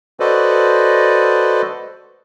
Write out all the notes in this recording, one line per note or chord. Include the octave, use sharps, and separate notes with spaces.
F#4 A4 B4 C5 D5 D#5